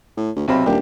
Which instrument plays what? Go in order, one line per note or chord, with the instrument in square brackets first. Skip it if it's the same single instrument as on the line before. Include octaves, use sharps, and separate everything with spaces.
[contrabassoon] A2
D2
[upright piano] B1 C4 B5 [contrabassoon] C3
[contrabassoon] D#1 [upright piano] A#3 D4 G4